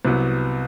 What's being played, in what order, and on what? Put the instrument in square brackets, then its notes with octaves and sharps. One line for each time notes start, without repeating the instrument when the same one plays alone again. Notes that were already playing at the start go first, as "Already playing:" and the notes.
[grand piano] C2 C3 F#3 B3